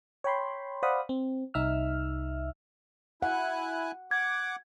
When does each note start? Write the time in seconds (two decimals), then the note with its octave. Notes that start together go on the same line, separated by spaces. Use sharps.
0.24 C#5 G5 B5 C6
0.83 C5 D5 F5 F#5 B5 D#6
1.09 C4
1.54 C2 D#4 E5 E6 F6
3.22 E4 F#5 G#5 F#6
4.11 F#5 D6 G#6